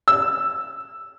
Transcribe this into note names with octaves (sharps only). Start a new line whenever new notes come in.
E6